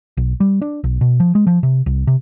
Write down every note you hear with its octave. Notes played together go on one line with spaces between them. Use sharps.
B1
G3
D4
B1
B2
F3
G#3
F3
C3
C2
C3